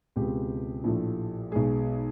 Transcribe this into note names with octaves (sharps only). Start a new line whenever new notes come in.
C#2 B2 G#3 C4 G4
A#1 A2 F3 A3
B1 B2 G#3 G#4